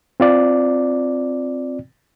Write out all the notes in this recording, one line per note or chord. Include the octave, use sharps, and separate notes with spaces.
C4 F4 D5